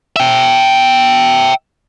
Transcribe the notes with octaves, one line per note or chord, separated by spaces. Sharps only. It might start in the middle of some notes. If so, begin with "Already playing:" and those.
E5 G5